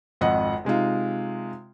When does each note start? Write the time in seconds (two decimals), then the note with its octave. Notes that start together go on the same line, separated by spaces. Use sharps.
0.21 G#1 F2 D#5 F#5
0.65 C3 G#3 D#4 F4